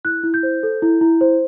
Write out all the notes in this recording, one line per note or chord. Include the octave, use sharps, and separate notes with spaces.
E4 F#6
E4
G6
C5
A4
E4
E4
C5